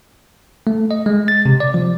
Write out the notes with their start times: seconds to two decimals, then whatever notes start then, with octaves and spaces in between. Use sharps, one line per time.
0.67 A3
0.91 D#5
1.06 G#3
1.28 A6
1.46 C3
1.60 D5
1.74 F3